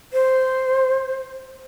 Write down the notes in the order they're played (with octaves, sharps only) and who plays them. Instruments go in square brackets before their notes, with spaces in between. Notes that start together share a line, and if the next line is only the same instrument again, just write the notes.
[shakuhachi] C5